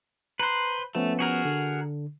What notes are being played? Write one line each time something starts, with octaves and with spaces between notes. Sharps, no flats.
B4 C5 A#5
F3 A3 B3 C#4
F#4 G#4 A#4
D3